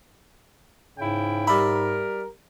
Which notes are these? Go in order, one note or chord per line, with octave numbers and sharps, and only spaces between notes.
G#2 C#3 E4 G5
G3 A#4 E5 B5